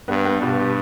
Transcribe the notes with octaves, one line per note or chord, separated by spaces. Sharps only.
G2 B3
B3
G2 B2
G4